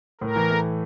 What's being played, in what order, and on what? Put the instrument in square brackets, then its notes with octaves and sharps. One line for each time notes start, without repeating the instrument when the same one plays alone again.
[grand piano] A2 [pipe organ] A#4
[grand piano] E3
A3